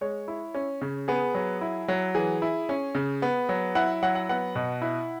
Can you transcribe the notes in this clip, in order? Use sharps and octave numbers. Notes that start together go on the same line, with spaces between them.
G#3 C#5
E4
C#4
C#3
B3 G#4
F#3
E4
F#3
E3 G#4
E4
C#4
C#3
B3
F#3
E4 F#5
F#3 F#5
F#5
B3 F#5
B2
E4